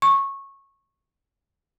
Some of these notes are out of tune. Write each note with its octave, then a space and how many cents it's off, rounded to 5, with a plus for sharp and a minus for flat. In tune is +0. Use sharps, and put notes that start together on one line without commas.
C#6 -15